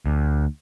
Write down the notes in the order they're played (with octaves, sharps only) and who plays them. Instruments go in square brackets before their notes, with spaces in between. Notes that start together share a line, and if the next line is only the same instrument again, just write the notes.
[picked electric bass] D2